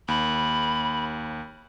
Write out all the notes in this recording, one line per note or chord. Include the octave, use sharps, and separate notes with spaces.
D#2 B5